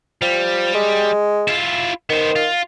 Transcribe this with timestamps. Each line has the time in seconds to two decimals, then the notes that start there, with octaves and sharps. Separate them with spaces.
0.22 F3 G3
0.75 G#3
1.48 E4 F4
2.10 D#3 B3 C5
2.36 F4